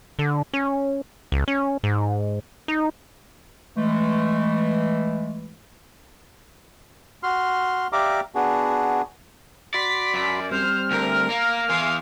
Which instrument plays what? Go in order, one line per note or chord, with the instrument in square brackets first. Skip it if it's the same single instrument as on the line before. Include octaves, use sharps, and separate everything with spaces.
[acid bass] D3
C#4
C#2
C#4
G#2
D#4
[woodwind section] E3 G#3 A3
[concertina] F#4 C6 F6
G4 D5 E5 F5 A#5 D6
B3 D4 F#4 G#4
[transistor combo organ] F#4 B5 C6 [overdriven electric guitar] D5 [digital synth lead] B6
[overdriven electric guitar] F#2 [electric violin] D5
[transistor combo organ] G3 C4 [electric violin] C5 [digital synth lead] F6
[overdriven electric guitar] D2 [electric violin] A#4
[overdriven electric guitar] A#3
[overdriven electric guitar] E2 E3 [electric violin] F5 C6 [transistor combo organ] G#5